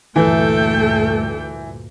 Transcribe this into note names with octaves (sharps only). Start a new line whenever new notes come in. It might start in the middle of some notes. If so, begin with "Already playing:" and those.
D2 G2 A#2 E3 A3 A4 G5